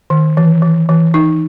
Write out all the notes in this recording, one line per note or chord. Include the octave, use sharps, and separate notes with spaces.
D#3
E3
E3
E3
D#4